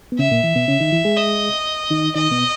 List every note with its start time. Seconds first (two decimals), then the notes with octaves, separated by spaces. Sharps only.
0.12 B3
0.19 C#3 C#4 E5
0.31 A#2 A#3
0.44 E3
0.55 B2 B3
0.68 C#3 C#4
0.80 D#3 D#4
0.92 E3 E4
1.05 G#3 G#4
1.17 D#5
1.91 D#3 D#4
2.15 D#3 D#4 D#5
2.31 B2 B3